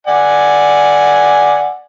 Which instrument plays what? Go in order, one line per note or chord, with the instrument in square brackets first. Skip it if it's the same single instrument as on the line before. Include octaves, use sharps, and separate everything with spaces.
[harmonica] D5 F#5 G#5